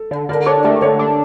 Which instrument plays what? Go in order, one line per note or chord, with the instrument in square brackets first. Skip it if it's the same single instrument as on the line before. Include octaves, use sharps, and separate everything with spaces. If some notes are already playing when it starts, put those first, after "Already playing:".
Already playing: [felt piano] A4
[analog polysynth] D3
[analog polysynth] D3 [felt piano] A#4 D5
[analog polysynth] D4 [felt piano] A4 C#5
[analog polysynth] A3 [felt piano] G4 A#4
[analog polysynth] D3 [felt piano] A4 C#5
[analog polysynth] D4